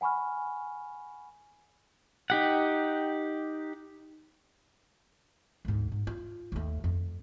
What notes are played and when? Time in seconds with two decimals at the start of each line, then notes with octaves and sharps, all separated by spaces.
0.01 F#5 G#5 B5 C#6 F6
2.30 D#4 G4 F#5
5.65 D2 G#2
5.92 G#2
6.07 F4
6.52 D#2 A3
6.84 F2